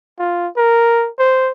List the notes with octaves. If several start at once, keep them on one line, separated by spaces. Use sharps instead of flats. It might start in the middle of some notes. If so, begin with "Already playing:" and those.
F4
A#4
C5